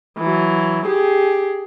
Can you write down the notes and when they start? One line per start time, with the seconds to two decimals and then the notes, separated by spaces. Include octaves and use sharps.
0.18 E3 F#3
0.86 G4 G#4